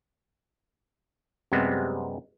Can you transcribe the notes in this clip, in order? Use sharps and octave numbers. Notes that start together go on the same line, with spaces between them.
F#2 C3 G3 G#3 B3 C4